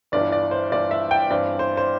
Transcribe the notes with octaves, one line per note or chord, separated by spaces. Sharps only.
G1 G2 E3 D5
D5
C5
G1 G2 E3 D5
E5
G5
G2 E3 C4 D5
C5
C5